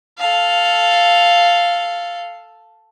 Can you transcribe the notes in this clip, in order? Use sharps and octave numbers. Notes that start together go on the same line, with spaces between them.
A4 F5